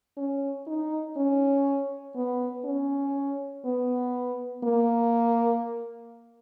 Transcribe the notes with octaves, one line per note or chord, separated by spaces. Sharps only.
C#4
D#4
C#4
B3
C#4
B3
A#3